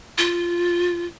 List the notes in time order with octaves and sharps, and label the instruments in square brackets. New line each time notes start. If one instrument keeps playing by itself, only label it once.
[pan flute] F4